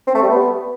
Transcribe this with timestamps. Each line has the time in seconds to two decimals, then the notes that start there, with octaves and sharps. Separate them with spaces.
0.07 C4
0.15 A3
0.22 G3
0.30 B3